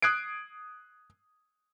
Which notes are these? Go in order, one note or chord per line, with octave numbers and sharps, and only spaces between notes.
D#6 F#6 G#6 C7 D7